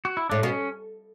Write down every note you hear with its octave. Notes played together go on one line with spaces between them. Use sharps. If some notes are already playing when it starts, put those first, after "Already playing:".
F#4
E4
A2 D4
B2 C#4